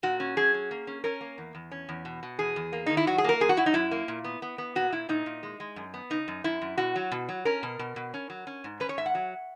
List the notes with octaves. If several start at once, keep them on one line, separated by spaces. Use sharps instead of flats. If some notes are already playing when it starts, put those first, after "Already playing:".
A#2 F#4
C#4
F#3 G#4
C#4
A#3
C#4
C#4 A#4
A#3
E2
E2
C#4
E2
B2
B2
E2 G#4
E2
A#3
D#3 D#4
E4
F#3 F#4
G#4
A#3 A#4
F#2 G#4
F#4
F#3 E4
D#4
F#2 E4
A#3
A#2
B3
B3
B3
A#2 F#4
A#2 E4
A#2 D#4
A#2
G#3
G#3
F#2
B3
C#3 D#4
F#2
F#2 E4
F#2
B2 F#4
F#3
B2
F#3
C#4 A#4
B2
B2
B2
C#4
F#3
C#4
G#2
C#4 B4
C#5
G#2 E5
F#5
F#3